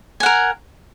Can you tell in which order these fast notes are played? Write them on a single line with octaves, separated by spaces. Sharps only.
G#5 F#5 A#4